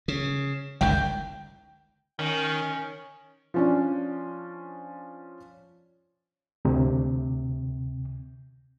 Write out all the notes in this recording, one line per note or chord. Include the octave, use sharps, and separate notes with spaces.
C#3
G1 C#2 D#3 G5 G6
D#3 C#4
F3 C#4 D4
D2 C3